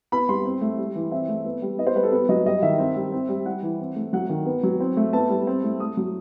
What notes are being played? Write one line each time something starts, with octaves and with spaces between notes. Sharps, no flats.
B3 B5
G3 C6
C4
A3
G3
E3
C4 E5
A3
B3
G3
B3 D#5
C5
G3 B4
A4
B3 B4
F#3 D#5
G3 D#5
D#3 E5
C4
G3
C4
G3
G3 F#5
E3
C4
A3
F#3 F#5
D#3
B3
F#3
C4
A3
B3 A5
G3
C4
A3
A3 D#6
F#3